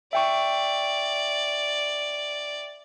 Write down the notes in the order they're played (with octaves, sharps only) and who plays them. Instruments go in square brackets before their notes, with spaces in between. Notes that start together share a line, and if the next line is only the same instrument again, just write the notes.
[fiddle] D5 [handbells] E5 G5 C#6